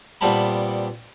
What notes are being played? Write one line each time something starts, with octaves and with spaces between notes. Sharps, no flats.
A#2 G3 B3 C4 A5 B5